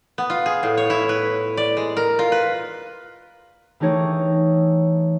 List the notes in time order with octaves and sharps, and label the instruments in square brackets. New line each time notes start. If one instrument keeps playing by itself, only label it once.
[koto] B3
F4
G#4
A2
C#5
E4
B4
D5
G#3
A#4
F4
B4
[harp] E3 A3 D#4 G4 G#4 C#5